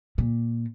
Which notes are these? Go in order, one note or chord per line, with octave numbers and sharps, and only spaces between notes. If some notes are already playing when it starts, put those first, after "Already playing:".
A#2